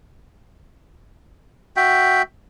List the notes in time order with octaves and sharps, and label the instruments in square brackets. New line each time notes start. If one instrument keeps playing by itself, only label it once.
[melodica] F#4 E5 G5